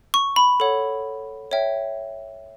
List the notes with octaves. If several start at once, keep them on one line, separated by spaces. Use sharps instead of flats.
C#6
B5
A4 C#5 F#5
C#5 E5 G5